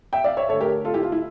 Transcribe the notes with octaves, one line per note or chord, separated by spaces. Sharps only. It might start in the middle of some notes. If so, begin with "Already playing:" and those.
E5 G5
D5 F5
C#5 E5
D3 A3 A4 C#5
G4 A#4
F4 A4
E4 G4
F4
E4